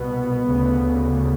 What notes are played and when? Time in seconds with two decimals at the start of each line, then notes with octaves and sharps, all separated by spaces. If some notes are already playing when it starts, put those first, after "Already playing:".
Already playing: C2 B2 B3
0.49 D2 C#3